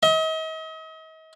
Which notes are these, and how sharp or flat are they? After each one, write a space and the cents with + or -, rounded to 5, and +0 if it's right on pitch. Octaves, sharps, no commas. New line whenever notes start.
D#5 +40